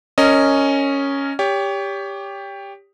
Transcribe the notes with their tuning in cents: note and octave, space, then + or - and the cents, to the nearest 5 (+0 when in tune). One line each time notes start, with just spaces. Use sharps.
C#4 +0 A#4 -25 D#5 +0
G4 +15 C#5 +30